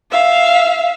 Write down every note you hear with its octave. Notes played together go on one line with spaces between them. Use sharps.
E5 F5